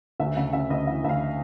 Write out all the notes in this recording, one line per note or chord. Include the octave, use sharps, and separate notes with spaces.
D2 E5
C#3 E5
C#3 E5
D2 D#5
E3 E5
D2 E5
F5